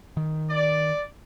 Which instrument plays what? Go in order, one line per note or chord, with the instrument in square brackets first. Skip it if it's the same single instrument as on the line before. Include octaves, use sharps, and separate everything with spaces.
[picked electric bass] D#3
[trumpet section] D5